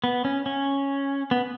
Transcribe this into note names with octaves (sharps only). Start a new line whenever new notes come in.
B3
C#4
C#4
B3